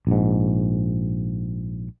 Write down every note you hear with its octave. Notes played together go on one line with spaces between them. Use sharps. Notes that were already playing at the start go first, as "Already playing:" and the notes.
A#1 G#2